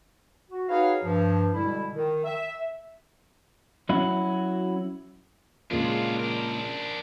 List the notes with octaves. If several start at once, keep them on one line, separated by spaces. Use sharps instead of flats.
F#4
D#4 F#4 G#4 B4 C#5 F5
G2 F3
B2 D3 G3 G#3 E4
D#3
E5
F#3 C#4 E4 F#4
A#2 C#3 G#3 D4 F4
D4 A#4